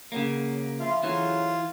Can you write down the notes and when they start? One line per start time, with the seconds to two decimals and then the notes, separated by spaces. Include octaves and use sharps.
0.12 C#3 F#3 A#3
0.80 F3 E4 F4 E5
1.04 D2 C#3 E3 F#3 F4